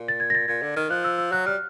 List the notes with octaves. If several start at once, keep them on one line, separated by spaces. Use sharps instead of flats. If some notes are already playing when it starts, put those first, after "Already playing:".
Already playing: A#2
A6
G#6
A#6
A6
A#2 G#6
D3
D#3 F6
F3 F#6
E6
E6
F#3 F#6
G3 F6